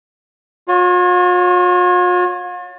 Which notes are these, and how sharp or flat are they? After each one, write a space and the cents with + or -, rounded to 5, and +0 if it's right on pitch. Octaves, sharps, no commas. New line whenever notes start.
F4 +45 C#5 +0